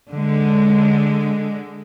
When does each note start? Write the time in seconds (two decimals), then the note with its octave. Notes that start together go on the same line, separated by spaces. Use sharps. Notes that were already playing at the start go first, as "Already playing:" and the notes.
0.10 D3 G#3